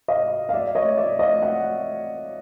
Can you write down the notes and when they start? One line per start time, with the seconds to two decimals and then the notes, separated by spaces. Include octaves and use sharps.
0.08 D#5 F5
0.49 F5
0.53 D5 E5
0.75 C#5 D#5
0.97 D5 E5
1.19 D#5 F5
1.42 E5 F#5